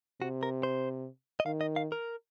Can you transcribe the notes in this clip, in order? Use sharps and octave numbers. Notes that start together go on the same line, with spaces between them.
C3 F#4
A#4
C5
D#5
D#3 F5
D#5
F5
A#4